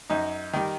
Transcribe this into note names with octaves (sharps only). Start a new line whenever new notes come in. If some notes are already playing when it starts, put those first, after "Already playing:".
F#2 D#4
D#3 G3